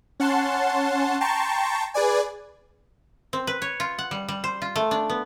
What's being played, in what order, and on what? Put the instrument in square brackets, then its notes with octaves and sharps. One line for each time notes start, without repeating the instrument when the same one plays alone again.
[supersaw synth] C#4 F#5 A5 C6
G5 A5 A#5 C6 C#6
G#4 B4 D5 G#5
[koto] C4
B4
C#5
F4
F#5
G3
G3
C5
F4
A3
D4
B3